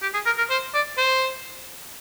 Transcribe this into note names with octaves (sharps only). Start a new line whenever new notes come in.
G4
G#4
A#4
A#4
C5
D5
C5